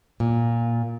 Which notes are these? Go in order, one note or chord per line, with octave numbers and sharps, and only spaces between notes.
A#2